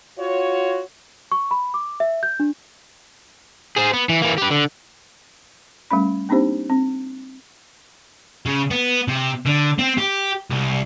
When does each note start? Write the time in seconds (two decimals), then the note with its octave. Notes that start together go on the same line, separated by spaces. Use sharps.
0.18 F4 F#4 C#5
1.32 C#6
1.51 B5
1.74 D6
2.00 E5
2.23 G6
2.40 D4
3.76 G#4 C5
3.94 B3
4.09 E3
4.22 E3 A#3
4.37 G4 B4
4.50 D3
5.91 G3 A3 C#4 B5
6.29 A#3 C4 D4 D#4 G4 C5
6.70 C4
8.46 C#3
8.71 B3
9.08 C3
9.46 D3
9.79 C4
9.98 G4
10.51 C2